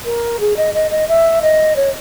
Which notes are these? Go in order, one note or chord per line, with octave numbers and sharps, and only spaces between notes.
A#4
G#4
D#5
D#5
D#5
E5
D#5
C#5